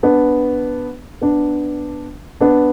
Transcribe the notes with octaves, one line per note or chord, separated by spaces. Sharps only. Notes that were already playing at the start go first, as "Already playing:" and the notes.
B3 D4
B3 D4
B3 D4